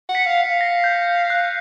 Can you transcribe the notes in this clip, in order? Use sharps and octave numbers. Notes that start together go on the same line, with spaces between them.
F#5
B6 C#7
F5
C7
F5
A#6
G6
G6
F#6